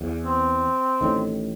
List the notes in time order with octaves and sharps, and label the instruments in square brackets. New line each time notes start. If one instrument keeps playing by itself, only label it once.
[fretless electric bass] E2
[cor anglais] C4
[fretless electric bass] A1 A2 D#3